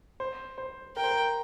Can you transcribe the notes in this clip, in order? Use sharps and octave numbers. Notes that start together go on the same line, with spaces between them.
C5
C5
A#4 G5
C5
A#4